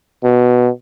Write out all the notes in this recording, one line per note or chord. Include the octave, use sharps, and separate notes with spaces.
B2